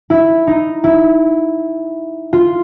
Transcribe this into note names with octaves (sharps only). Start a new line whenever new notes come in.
E4
D#4
E4
F4